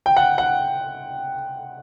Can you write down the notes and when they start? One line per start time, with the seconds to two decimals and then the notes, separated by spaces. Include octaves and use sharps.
0.06 G5
0.17 F#5
0.38 F#5